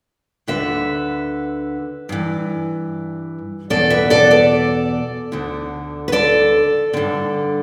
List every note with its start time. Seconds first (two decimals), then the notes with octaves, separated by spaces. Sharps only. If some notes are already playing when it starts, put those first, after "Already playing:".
0.47 D2 D3 B4 E5
2.09 G2 E3
3.70 E2 B2 A4 D5
3.90 B4 E5
4.10 A4 D5
4.31 A4 D5
5.32 D2 D3
6.08 B4
6.12 A4 D5
6.93 G2 D3